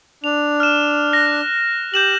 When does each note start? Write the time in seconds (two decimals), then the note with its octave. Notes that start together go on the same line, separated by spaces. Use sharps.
0.24 D4 F7
0.60 F6 E7
1.13 F#6 A#6
1.94 G4 G6 E7 F#7